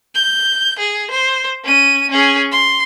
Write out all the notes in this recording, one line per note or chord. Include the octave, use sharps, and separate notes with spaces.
G6
G#4
C5
C#4 D#7
C#4 G#4
C6